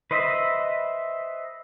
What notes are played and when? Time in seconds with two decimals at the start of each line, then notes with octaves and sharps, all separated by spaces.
0.11 B4 C5 D#5 E5 B5